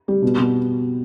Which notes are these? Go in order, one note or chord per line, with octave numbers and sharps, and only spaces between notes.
G3
B2
B2